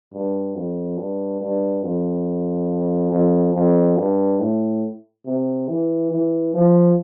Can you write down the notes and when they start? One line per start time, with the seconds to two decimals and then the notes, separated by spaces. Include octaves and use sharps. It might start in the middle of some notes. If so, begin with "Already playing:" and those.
0.13 G2
0.56 F2
0.98 G2
1.41 G2
1.83 F2
3.12 F2
3.55 F2
3.97 G2
4.40 A2
5.26 C3
5.69 E3
6.11 E3
6.54 F3